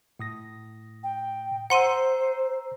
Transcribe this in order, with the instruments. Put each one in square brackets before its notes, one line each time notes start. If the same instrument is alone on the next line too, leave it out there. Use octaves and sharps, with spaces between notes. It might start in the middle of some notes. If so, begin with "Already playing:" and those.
[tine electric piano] A2 D#6 A#6
[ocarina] G5
[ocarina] C5 [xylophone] F#5 C6 D#7 [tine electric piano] A#5 E6